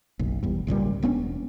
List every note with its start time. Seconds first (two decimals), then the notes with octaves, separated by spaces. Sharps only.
0.19 F#1 B1
0.43 G1 E2 G2
0.67 G#1 C#2 A#2 G3
1.02 E1 B3 C#4 D4